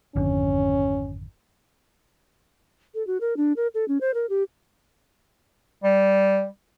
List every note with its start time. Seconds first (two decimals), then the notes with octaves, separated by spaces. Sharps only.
0.16 G#1 F2 D3 C#4
2.95 A4
3.07 F#4
3.21 A#4
3.37 D4
3.56 A#4
3.74 A4
3.88 C#4
4.01 C5
4.14 A#4
4.29 G4
5.84 G3